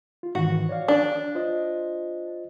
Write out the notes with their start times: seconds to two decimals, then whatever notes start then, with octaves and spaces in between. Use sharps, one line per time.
0.23 F4
0.35 G#2 D#3 E3 F#4
0.69 C#5 D5 F5
0.88 D4
1.35 F4 C5 D#5